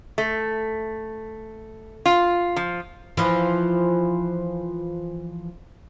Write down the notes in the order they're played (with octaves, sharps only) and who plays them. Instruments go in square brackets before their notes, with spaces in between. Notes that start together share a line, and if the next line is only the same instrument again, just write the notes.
[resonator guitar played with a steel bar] A3
F4
F3
[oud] E3 F3